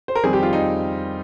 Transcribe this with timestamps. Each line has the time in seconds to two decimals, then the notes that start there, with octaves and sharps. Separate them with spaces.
0.08 C5
0.15 A#4
0.23 F2 D#3 G3 C4 G#4
0.33 G4
0.43 F4
0.53 D#4